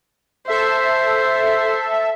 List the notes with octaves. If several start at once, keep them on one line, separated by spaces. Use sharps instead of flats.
A4 C5 E5